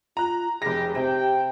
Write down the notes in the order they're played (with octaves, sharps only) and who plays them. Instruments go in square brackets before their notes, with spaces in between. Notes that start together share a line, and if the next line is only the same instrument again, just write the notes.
[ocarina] F4 [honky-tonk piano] A#5 F#6
[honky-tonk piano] F1 A#6 [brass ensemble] G4 [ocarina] G#4
[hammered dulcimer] C3 [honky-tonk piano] C4 [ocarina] G4 [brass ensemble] G5